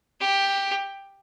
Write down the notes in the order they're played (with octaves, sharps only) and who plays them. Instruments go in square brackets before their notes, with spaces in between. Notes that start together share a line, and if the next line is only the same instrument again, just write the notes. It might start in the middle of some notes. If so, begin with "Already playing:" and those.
[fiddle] G4